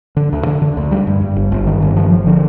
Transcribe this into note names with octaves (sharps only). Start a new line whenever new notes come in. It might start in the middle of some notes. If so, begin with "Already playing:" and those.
D3
D2
D3
D3
D2
G3
G2
G2
G1
G1
D#3
G1
F3
F3
D3